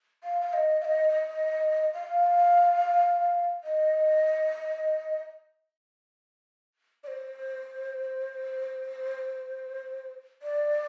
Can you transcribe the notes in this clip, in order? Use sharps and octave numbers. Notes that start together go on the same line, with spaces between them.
F5
F5
D#5
F5
D#5
D#5
F5
D#5
D5
C5
D5